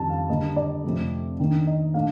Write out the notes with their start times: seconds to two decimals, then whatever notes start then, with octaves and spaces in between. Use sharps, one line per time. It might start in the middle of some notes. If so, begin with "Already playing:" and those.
Already playing: F2 D#3 G3 A5
0.10 F5
0.29 D3 G3 A#3 D#5
0.56 D5
0.84 F2 C3 F3 A3
1.40 D#3 A#3 D4
1.67 D#5
1.94 A#2 A3 D4 F5